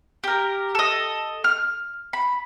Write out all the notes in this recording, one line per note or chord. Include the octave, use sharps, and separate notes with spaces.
G4 A#4
A4 D#5
F6
B5